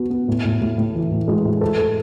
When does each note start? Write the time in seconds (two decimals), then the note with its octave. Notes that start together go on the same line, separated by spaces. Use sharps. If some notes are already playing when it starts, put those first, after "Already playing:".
Already playing: B3 F#4
0.10 B3
0.28 A2
0.45 A2
0.61 A2
0.78 A2
0.94 E3
1.11 A2
1.28 G#3
1.45 A2
1.61 A4
1.78 A4